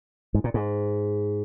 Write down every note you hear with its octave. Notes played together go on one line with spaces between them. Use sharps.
G#2
A#2
G#2